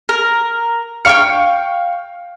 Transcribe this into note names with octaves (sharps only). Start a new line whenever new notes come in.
A#4
F5 G5 C#6 F6 C#7